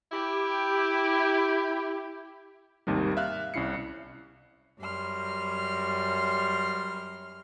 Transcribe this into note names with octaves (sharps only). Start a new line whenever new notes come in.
E4 G4
G#1 D#2 C3 D#3 G3
E5 F5 F6 F#6
C2 C#4 E4 C7 C#7
F#2 G3 C6 F6